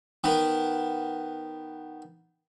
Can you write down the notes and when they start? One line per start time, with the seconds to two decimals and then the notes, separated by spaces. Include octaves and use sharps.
0.24 D#3 B3